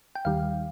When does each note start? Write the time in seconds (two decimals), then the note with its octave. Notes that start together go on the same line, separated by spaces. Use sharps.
0.15 G5
0.25 D#2 D#3 G3 F5